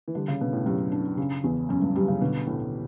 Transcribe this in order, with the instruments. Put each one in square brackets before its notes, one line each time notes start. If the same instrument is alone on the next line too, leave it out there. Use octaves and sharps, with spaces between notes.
[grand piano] E3
[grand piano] D3 [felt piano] G3
[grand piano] C#3
[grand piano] B2 [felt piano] D3
[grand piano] A2
[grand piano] F#2 [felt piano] G4
[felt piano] D4
C#3
E2
[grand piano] F#2 [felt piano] C#4
[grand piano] G2
[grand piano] F#2 [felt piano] G3
[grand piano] C#3
[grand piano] B2 [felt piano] D3
[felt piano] D2 [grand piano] A2